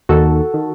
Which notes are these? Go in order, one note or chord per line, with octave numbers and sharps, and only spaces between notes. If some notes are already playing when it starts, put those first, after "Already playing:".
D#2 D#3 F#4 A4
D#3